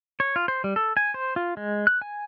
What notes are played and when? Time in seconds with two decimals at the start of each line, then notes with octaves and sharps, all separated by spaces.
0.20 C#5
0.36 F4
0.48 C5
0.64 G3
0.76 A4
0.97 G#5
1.14 C5
1.36 F4
1.57 G#3
1.87 F#6
2.02 G#5